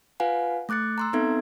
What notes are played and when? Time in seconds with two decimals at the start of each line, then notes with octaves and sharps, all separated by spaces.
0.20 F4 B4 F5 F#5 G#5
0.69 A3 D6 F#6 A6 C#7
0.98 A#5 C6 E6
1.13 B3 C4 D#4 A4 E5 G#6